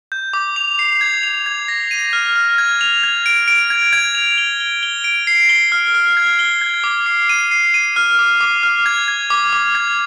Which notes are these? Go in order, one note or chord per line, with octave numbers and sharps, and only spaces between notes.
G6
D6
F7
C7
G#6
F7
G#6
A#6
D#7
F6
F6
G#6
F7
G#6
D7
D7
G#6
G#6
F7
G7
G7
G7
D7
C7
G7
F6
F6
G#6
G7
G#6
D6
C7
D#7
C7
D#7
F6
D6
D6
F6
G#6
G#6
D6
D6
G#6